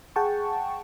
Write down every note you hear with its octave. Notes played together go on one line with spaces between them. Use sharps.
G#4 F#5 G5 A5 C#6